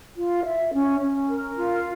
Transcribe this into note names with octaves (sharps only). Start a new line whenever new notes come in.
F4
E5
C#4
C#4
A#4
F4